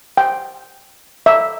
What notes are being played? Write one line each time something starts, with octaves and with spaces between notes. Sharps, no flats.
G5
E5